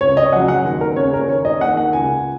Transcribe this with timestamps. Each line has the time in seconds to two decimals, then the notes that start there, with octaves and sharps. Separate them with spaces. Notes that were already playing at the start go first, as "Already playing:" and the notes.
0.01 C#2 C#5
0.17 D#5
0.33 C#3 F#3 F#5
0.48 F#5
0.64 D#2
0.81 A#4
0.96 C#3 A#3 C#5
1.14 A#4
1.29 D#2 C#5
1.45 D#5
1.61 D#3 A#3 F#5
1.77 F#5
1.93 C#2 G#5